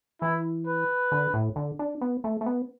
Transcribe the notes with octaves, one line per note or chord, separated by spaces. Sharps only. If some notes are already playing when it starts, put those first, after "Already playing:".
E3 E4
B4
D3
A2
D3
D4
B3
A3
A3
B3